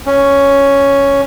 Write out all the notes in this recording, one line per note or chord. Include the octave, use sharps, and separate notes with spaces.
C#4